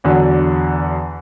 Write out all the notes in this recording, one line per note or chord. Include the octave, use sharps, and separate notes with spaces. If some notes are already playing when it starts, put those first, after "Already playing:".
E2 D3 F#3